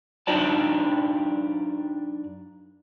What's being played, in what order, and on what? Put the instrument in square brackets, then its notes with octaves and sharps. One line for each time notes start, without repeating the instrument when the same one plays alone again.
[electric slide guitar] F#2 D4 D#4 F#4 D5 A5